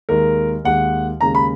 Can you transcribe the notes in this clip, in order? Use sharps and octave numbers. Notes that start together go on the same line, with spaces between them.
D#2 D#3 G#3 A#4
D#2 D#3 G#3 F#5
D#2 C#3 G#3 A#5
B5